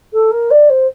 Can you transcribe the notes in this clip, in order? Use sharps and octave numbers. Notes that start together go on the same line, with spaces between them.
A4
A#4
D5
C5